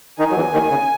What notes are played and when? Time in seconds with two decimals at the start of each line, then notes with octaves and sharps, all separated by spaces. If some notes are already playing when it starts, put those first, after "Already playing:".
0.19 D#3 D#4 G#5
0.31 F#3
0.36 E2 E3
0.53 D#2 D#3
0.70 C#3